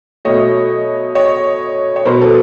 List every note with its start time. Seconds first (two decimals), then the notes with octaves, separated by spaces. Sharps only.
0.25 B2 F#3 A3 C#5 D#5
1.15 C#5 D#5
1.96 C#5
2.05 B2 F#3 B3 A#4 C5
2.21 A4 B4